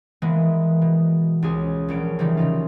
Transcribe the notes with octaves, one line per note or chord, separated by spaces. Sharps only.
E3 G#3 A#3 B3
B2
C#2 G#4
A#1 C#4 D7
C#3 E3 G3 G#3 C#4 D#4
C#3 D#4 F4